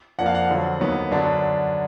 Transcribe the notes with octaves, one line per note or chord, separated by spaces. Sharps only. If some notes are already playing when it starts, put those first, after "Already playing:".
F2 F3 A#3 D4 F#5
F5
F#5
F2 D3 F#3
D#2 D#3 F#3 B3
F#2 D3 F#3 B3 D4